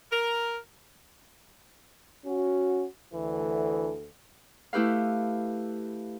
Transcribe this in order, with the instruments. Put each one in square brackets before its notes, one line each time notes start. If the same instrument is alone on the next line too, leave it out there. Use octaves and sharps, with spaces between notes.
[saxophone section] A#4
[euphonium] C#4 [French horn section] F#4
[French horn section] D2 A4 [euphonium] E3
[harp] A3 E4 G4 B4 F5